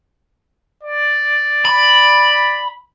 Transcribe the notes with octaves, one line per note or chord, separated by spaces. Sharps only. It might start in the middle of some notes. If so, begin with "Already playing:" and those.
D5
B5